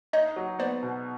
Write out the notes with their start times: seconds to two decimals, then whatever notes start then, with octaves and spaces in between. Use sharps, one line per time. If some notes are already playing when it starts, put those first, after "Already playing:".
0.13 D#4 C#5 D#5
0.36 F#3
0.59 B3 C5 D5
0.83 B2